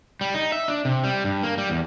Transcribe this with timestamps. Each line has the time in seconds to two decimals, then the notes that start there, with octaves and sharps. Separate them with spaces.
0.21 G3
0.34 D#4
0.52 E5
0.68 D4
0.85 C3
1.04 G3
1.24 G2
1.43 A#3
1.58 G3
1.70 E2